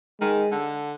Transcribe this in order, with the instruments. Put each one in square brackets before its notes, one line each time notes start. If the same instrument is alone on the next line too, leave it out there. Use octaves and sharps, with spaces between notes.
[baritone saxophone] D#3 [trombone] G#3
[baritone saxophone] D3